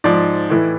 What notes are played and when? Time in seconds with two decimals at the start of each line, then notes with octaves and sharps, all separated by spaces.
0.04 G#2 F3 D5
0.50 A2 E3